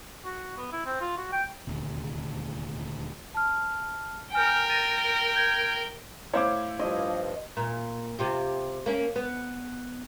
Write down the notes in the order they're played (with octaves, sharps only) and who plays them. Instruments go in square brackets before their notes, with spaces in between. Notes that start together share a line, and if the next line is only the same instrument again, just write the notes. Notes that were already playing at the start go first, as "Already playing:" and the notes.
[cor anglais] F#4
B3
E4
C4
F4
F#4
G5
[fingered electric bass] D#1 D2 C3
[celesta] A5 F6
[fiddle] A#4 G5 [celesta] G#5 F6 G6
[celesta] A6 A#6 D#7
G6 G#6 D7
[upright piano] A2 C5 C#5 [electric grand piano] E4 F5 D6
[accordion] G2 F3 [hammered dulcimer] D#5
[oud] A#2
C3 F4 G4
A#3 C#4
B3